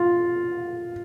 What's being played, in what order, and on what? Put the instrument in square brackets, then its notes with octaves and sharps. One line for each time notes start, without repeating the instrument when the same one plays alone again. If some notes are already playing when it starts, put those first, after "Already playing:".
Already playing: [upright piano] F4